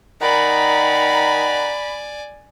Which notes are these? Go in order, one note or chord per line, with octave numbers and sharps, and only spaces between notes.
D#3 D5 F#5 G#5 A#5 B5